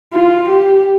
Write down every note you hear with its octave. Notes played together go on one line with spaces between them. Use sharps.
F4
G4